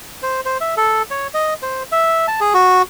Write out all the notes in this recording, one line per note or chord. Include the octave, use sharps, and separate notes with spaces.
C5
C5
E5
A4
C#5
D#5
C5
E5
A5
G#4
F#4